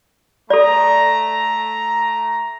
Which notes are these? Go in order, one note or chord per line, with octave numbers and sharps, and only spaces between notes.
A3 A4 D5 A#5